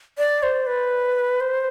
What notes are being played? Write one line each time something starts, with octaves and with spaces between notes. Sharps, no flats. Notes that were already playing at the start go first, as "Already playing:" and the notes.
D5
C5
B4
C5